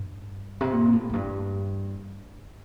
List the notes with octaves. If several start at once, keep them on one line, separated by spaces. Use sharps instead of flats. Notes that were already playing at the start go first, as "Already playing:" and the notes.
Already playing: G2
C3
A#2
A2
F2
G2